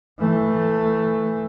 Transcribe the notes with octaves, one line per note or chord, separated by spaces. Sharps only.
E3 A3